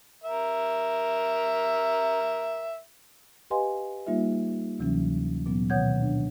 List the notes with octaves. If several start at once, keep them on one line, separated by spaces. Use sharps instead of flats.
A#4 E5
G4 B4 D#5 F5 G#5 C6
G3 A#3 D#4 F4 E5
D2 C3 E3 F#3 C#4
A#2 F#3 B3
B2 D#3 C#5 F#5 G6 G#6
D4